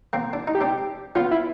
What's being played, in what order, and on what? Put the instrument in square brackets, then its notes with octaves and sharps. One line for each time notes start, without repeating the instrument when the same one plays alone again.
[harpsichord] A#3 C4
D4
D#4
[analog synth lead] G4
[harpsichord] C4 D4
[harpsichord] B3 C#4 [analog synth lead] F4
[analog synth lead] E4